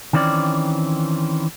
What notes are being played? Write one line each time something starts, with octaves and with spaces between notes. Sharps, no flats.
D#3 E3 C4 C#4 D5